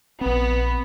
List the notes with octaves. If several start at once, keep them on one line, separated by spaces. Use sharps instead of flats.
A#1 B3 C4